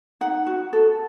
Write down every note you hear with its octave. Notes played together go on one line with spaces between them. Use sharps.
D#4 F#5
F#4
A4